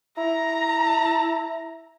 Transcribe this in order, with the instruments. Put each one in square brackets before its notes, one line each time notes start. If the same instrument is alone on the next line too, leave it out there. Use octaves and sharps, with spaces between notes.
[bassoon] E4 [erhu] A#5